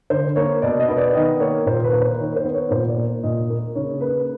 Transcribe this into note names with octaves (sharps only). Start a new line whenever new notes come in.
D3 C5
A#3 C#5
B2 D5
D#5
B3
D5
D#3 D#5
A#3 C#5
A#2 C5
B4
A#3
C5
D#3 C#5
C5
B3
C#5
A#2 C5
D5
A#3
A#2 D#5
A#3
C#3 C#5
A#3 B4